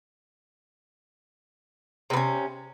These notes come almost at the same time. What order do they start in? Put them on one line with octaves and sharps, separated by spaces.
C3 B3 C#4